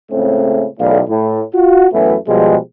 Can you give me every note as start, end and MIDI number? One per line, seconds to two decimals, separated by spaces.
0.11 0.65 37
0.11 0.65 45
0.11 0.65 49
0.11 0.65 57
0.11 0.65 60
0.11 0.65 61
0.80 1.00 35
0.80 1.00 40
0.80 1.00 45
0.80 1.00 57
0.80 1.00 74
0.80 1.00 77
1.09 1.41 45
1.54 1.87 65
1.54 1.87 66
1.92 2.15 42
1.92 2.15 45
1.92 2.15 52
1.92 2.15 54
1.92 2.15 57
1.92 2.15 59
2.27 2.57 47
2.27 2.57 53
2.27 2.57 55
2.27 2.57 56